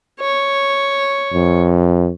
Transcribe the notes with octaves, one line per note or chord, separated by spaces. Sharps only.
C#5
F2